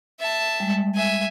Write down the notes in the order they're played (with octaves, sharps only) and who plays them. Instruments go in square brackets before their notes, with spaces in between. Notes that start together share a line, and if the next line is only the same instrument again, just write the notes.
[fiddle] E5 A5
[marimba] G3 G#3
[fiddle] E5 G#5